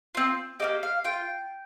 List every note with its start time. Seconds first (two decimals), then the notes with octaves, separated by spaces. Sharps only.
0.15 C4 F4
0.60 A#3 D#4 G4 D#5
0.83 F5
1.04 F4 G5